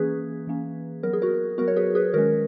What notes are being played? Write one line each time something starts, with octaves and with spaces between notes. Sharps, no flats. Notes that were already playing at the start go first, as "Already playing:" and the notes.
Already playing: E3 A#3 C#4 G#4 B4
E3 A#3 C#4
F#3 B3 A#4
G#4
F#4 A#4
F#3 B3 F#4 A#4
C#5
G#4 B4
G#4 B4
D#3 G#3 C#4 F#4 A#4